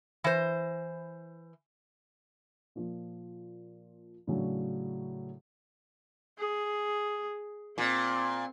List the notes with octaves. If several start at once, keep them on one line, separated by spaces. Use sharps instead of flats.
E3 C5
A#2 F3
A2 C#3 F#3 D4
G#4
A#2 C4